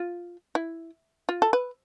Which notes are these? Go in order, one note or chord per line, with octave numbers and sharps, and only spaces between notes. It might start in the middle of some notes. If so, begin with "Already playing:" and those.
Already playing: F4
E4
F4
A4
B4